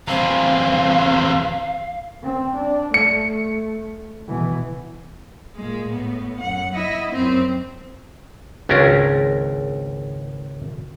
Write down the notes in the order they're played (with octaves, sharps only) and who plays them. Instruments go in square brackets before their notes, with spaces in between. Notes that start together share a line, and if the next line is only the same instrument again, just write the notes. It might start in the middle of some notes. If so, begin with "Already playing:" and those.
[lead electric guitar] E2 C4 [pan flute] F5
[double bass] C4
D4
[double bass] A3 [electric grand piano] C#7
[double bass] B2 E3
[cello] A#2 G#3
A2 B3
F#2 F#5
E4 D#5
F#2 C4
[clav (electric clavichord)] G#1 C#2 C#4 D4 A#4